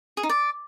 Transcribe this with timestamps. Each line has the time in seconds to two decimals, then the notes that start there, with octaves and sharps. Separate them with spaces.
0.17 G#4
0.23 D#4
0.29 D5